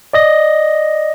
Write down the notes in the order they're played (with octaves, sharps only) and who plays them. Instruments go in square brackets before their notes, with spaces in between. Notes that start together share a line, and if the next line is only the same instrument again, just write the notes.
[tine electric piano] D5 D#5 A#6